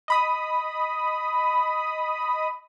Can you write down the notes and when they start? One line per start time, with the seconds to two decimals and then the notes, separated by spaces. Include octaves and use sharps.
0.08 D#5 B5 D#6